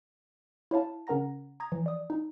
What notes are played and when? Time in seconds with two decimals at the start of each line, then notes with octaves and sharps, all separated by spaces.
0.71 E4 C#5 F5 A5
1.07 C#3 C#4 A#4 F#5 A#5 A#6
1.60 A#5 D#6 G#6 A#6
1.72 E3 F3
1.86 D5 D#6
2.10 D#4